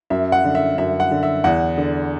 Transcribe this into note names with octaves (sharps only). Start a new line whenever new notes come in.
F#2 E5
F#5
D3
E5
F#2 E5
F#5
D3
E5
E2 F#5
D3